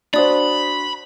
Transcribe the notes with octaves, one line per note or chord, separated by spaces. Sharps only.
D4 F#4 C5 D5 B5 D#6